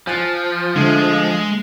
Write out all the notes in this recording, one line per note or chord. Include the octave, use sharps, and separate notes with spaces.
F3 G#5 F#6 A6
D3 G#3 A3